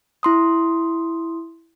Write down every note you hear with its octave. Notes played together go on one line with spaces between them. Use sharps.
E4 C6 D#6